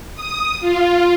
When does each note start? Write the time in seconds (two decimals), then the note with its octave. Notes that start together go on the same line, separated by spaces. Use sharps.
0.15 D#6
0.61 F4